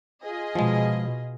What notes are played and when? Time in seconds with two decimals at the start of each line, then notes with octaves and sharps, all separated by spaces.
0.23 F4 G#4 D#5
0.55 B2 F3 G#3